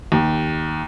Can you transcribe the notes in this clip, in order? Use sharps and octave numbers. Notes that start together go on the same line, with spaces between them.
D#2